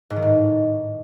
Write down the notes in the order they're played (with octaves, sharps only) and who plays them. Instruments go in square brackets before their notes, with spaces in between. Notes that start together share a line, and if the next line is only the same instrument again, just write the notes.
[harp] G#2
D#3
A2